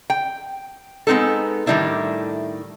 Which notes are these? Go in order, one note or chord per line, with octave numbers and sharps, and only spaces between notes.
G5
G#3 B3 C4 D#4 A4
A2 D#3 G3 D4 E4 A4